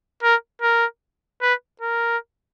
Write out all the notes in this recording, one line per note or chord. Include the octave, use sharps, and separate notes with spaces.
A#4
A#4
B4
A#4